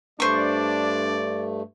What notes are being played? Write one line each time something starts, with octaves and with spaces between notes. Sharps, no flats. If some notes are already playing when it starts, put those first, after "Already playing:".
G2 A3 D4 C5 D5 C#6